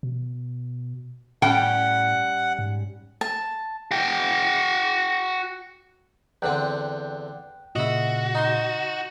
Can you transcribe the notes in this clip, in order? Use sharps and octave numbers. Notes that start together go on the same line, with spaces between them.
B2
A2 G3 C#4 F#5 G5
G#2
A5
F#4 G5
E2 D3 C4 G5 F#6
A#2 C#3 E4 F#4 D#5
D#4 C6